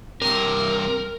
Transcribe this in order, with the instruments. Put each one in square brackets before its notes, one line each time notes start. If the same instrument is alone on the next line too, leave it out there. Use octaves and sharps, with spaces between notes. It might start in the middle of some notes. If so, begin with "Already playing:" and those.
[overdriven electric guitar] G2 C3 [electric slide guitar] A#4